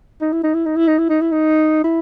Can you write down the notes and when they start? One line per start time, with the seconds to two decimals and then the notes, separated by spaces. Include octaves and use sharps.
0.21 D#4
0.33 E4
0.43 D#4
0.54 E4
0.66 D#4
0.76 E4
0.88 D#4
0.99 E4
1.09 D#4
1.21 E4
1.32 D#4
1.84 E4